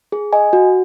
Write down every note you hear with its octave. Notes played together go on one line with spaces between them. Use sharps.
G#4
D#5 G#5
F#4